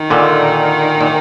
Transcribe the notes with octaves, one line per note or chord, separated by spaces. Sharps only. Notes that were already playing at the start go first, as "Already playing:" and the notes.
Already playing: D#3
A#2 D3
A#2